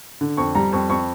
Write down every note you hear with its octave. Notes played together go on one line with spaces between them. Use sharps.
D3
F2 C#6
G3 A#5
F2 C#6
F2 C#6